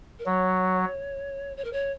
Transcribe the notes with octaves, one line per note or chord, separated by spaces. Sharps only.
A#4
F#3 C#5
C#5
A#4
C#5